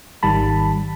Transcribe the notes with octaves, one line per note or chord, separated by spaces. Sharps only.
G#1 D#3 G3 A5 B5